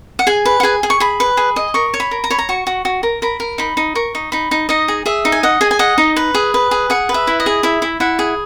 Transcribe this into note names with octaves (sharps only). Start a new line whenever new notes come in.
F#5
G#4 G#5
B4
F#5
G#4 G#5
G#4
C#6
G#4 B5
B4
G#4
D#5
A#4 C#6
C#5
B5
A#4
A#5
C#5 B5
A#5
F#4 C#6
F#4
F#4
A#4
A#4 B5
A#4
D#4 B5
D#4
A#4 C#6
D#4
D#4 B5
D#4
D#4 D#5
G#4
G#4 E5
D#4
G#5
D#5 F#5
G#4 G#5
G#5
D#5 F#5
D#4
B4
G#4
B4
G#4
G#4 F#5
B4
E5
E4
D#5
G#4
E4 E5
E4
E4 F#5
G#4